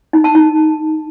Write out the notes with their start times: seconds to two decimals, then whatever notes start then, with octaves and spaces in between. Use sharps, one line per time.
0.13 D#4
0.24 A5
0.35 D#4